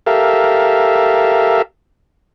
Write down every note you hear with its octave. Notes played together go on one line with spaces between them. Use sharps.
G4 A4 A#4 E5 F5